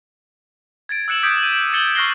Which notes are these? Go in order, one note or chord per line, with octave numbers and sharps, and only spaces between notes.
G#6 A6 D7
E6 F#6 C#7 E7 F#7
D6 D#6 G6 G#6 B6 D7
D#7
G#6 A6 C#7 F#7 G7
C#6 F6 F#6 A#6 C7 G7